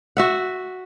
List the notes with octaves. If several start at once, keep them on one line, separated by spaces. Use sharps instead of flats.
F#4 E5 F#5